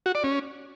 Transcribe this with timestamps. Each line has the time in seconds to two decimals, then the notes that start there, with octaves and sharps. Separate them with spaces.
0.06 F#4
0.15 D5
0.24 C#4